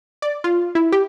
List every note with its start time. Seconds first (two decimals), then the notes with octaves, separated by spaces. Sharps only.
0.22 D5
0.44 F4
0.75 E4
0.92 G4